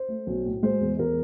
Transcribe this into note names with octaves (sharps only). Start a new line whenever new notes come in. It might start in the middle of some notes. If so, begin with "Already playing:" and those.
Already playing: C5
A3
B1
A2
G#3 C5
E2
E2 A#4